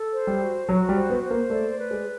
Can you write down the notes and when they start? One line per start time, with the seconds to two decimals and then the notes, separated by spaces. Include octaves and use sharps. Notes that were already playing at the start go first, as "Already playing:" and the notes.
Already playing: A4
0.13 C5
0.27 G3
0.41 F#4
0.68 F#3 F#4
0.89 G3
0.96 C5
1.10 B3
1.23 C5
1.30 A#3
1.50 A3 D5
1.78 B4
1.91 G#3